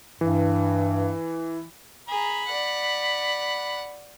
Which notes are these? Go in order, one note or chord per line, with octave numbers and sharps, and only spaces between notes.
G2 E3
G#4 A#5 B5
D5 F#5